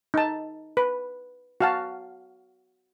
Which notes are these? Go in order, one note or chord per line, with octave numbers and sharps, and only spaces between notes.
D#4 A5
B4
F#4 F5 A5